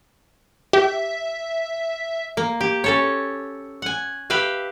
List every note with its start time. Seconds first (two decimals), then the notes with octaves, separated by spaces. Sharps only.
0.73 G4 E5
2.37 A#3
2.61 G4
2.84 C#4 A4 C#5
3.82 F#5 G#5
4.30 G4 B4 E5 F5